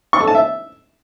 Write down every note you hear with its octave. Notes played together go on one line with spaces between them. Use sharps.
C#6
A4
A5
E5